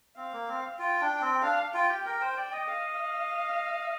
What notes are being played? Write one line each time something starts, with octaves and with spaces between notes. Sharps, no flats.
C4 F5
A#3
C4
F4 G5
D4
C4
D4 F5
F4 G5
G4
A#4 G5
C5
D5
D#5
F5